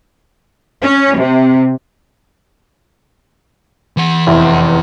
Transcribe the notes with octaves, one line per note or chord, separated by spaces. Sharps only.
C#4
C3
E3 F#5
F1 E2 E4